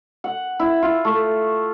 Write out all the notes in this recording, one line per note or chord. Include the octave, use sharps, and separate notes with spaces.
F#5
E4
F4
A3